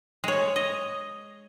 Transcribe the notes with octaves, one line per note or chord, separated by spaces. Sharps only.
G#3 C#5
D#5